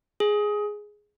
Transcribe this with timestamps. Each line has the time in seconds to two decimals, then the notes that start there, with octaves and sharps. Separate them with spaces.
0.20 G#4